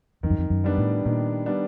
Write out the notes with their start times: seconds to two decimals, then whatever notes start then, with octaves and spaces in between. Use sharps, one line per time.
0.23 F2 D#3
0.30 F#2
0.38 F2
0.50 F#2
0.64 G3 B3 D4
0.78 A2
1.05 A#2 D#3
1.46 G3 B3 D4